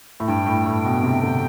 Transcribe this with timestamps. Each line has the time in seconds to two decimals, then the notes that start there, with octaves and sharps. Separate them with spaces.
0.20 A2
0.28 G2 G5
0.46 A2
0.66 A2
0.84 B2
1.03 C3
1.23 D3